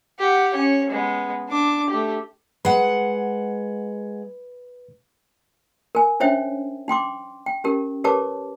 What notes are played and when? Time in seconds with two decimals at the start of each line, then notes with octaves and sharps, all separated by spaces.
0.20 G4 F#5
0.53 C#4 C#5
0.90 G#3 B3
1.49 D4 D6
1.89 A3 G4
2.65 G#3 B4 F#5
5.95 A#4 G#5
6.20 C#4 D4 C5 C#5 E5 G5
6.88 D#4 G5 C6 D6
7.46 G5
7.64 C#4 D#4 G4 A#4
8.04 G4 A#4 B4 C#5 A5 D6